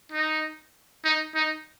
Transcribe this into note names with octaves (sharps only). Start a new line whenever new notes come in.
D#4
D#4
D#4